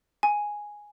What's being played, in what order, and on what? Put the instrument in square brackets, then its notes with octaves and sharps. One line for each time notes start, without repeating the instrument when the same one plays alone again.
[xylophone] G#5